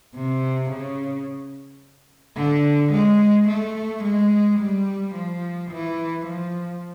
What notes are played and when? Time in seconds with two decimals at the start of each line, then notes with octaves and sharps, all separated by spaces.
0.15 C3
0.71 C#3
2.37 D3
2.92 G#3
3.48 A3
4.04 G#3
4.60 G3
5.15 F3
5.71 E3
6.26 F3